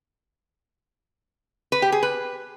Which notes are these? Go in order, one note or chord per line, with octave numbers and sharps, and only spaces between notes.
B4
G4
G#4
B4